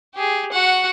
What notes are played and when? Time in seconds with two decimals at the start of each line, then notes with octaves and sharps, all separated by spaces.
0.15 G4 G#4
0.52 F#4 F#5